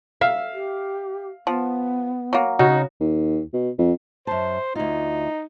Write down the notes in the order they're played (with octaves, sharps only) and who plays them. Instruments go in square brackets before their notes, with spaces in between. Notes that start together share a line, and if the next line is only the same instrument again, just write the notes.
[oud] E5 [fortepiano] F5
[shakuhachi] G4
[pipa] F3 [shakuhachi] B3
[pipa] F#3 A#3
[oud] C#3 [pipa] D#4 [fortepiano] F#4
[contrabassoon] D#2
B2
F2
[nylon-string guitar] F#2 A5 [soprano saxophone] C5
[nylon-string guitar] D2 F4 [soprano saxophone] D#4